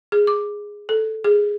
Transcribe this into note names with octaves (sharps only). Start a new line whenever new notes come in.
G#4
D6
A4
G#4